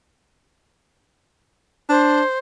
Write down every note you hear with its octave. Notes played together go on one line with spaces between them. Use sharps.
D4 C5